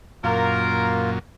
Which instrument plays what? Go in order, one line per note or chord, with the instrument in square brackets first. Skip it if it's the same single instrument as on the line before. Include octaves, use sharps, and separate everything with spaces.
[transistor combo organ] F#2 A#2 [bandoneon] A#3 F4 [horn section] A#4